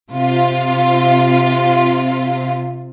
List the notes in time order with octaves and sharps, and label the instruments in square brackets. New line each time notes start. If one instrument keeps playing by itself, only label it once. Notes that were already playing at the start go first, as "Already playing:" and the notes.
[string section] C3 F4